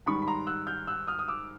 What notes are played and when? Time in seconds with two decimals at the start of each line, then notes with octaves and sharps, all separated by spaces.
0.06 G#2 D#3 G3 B5 C#6
0.22 B5
0.27 A#5 C6
0.47 E6 F#6
0.67 F6 G6
0.87 E6 F#6
1.07 D#6 F6
1.19 D#6
1.28 D6 E6